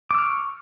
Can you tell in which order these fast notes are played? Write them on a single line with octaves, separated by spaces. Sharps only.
D6 E6 F6 C#6